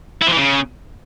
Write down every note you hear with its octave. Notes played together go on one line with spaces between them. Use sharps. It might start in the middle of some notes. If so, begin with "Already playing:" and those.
E4
F3
E3
C#3